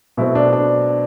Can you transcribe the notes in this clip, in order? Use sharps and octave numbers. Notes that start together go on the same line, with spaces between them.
B2 F#3 A3 C4 E4
D4
D4